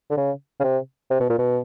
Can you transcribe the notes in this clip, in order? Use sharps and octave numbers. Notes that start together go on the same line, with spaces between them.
D3
C#3
C#3
C3
C3
B2
A#2
B2